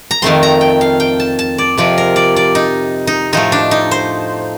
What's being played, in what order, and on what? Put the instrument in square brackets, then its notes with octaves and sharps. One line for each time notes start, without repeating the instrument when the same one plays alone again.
[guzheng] A#5
F2 D#3 A3 C4 C6
A#5
G5
F5
G5
A5
A5
D5
F2 C3 F3 D5
A#4
D5
D5
D#4
D#4
A2 F3 A3 D#4
D4
D#4
C5